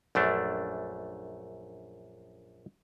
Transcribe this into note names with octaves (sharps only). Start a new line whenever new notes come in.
A#1 F#2 A3 D4